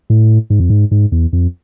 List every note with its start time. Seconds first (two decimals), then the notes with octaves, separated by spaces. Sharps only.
0.10 A2
0.50 G#2
0.60 F2
0.70 G#2
0.91 G#2
1.12 E2
1.33 F2